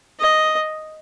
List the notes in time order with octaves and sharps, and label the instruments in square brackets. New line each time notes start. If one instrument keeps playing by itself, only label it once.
[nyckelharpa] D#5